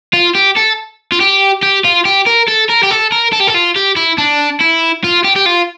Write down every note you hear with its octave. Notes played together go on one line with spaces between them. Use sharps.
F4
G4
A4
F4
G4
G4
F4
G4
A#4
A4
A#4
G4
A4
A#4
A4
G4
A4
F4
G4
E4
D4
E4
F4
G4
G4
F4